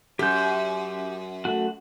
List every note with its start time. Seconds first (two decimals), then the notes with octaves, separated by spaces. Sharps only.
0.19 F#2 G4 G6
1.45 A3 F#4